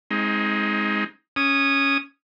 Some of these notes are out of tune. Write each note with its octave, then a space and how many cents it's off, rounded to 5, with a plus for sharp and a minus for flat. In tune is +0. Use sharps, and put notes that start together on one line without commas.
G#3 +0 C4 +20 D#4 +25
C#4 +0 D#6 -10